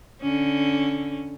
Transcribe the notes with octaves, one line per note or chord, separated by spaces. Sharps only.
D3 C#4